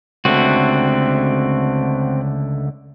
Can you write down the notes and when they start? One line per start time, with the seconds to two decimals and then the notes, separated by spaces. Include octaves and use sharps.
0.25 C#2 D3 A3 C4 F#4